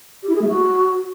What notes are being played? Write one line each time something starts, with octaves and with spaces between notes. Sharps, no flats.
G4
E4
G#4
A3
F#4